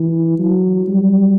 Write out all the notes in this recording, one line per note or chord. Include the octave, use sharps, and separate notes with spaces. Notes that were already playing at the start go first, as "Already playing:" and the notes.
Already playing: E3
F#3
G3